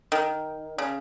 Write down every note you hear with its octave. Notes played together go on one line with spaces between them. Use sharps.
D#3
C#3